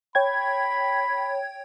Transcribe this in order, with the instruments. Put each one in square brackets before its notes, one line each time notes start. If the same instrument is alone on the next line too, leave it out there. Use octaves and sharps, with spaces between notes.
[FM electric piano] C#5 G5 G#6 [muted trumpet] B5